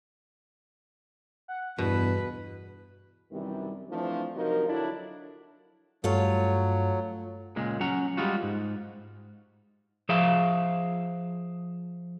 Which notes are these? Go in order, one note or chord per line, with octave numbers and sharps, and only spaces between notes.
F#5
E2 G2 B2 B4
F#2 C3 D#3 E3 G3
E3 F3 A3 C4 D4
C3 F3 F#3 D#4 A#4
D3 F#3 D4 E4
G2 F#3 A3 F4 C#5
C#2 A#2 G#3
F#3 C#4 F#5 A#5
G3 G#3 F4 F#4
G#2
F3 G#4 E5 F5